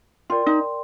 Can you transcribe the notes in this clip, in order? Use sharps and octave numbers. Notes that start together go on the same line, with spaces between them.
F4 A#4 D5 G5 C6
D#4